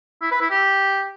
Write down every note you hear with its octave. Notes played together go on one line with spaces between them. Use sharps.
E4
B4
E4
G4